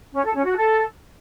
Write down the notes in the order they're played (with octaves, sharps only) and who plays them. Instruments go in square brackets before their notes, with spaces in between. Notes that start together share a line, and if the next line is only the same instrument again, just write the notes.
[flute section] C#4
A4
C#4
F#4
A4